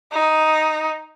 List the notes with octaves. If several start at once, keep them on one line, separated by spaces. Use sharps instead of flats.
D#4